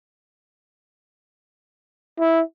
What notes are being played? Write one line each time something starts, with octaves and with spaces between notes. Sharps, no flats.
E4